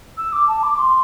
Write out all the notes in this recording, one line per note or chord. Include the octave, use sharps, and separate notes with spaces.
E6
D6
A5
D6
D6
C6